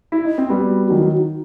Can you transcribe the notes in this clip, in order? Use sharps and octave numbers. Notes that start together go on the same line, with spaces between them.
E4
D#4
C4
G3 B3 F#4
D#3 F#3 F#4
E4
F#4
D#4